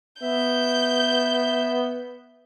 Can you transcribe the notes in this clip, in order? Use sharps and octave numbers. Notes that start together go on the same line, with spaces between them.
B3 E5 G6